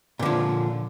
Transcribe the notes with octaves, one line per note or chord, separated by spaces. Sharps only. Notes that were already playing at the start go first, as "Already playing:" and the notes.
A#2 D3 F3